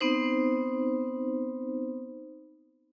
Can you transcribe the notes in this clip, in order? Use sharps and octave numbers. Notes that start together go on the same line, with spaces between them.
B3 C4 D#4 C5